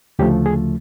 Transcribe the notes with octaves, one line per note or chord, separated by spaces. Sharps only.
D2 C#3 F3 A3 G4
G#4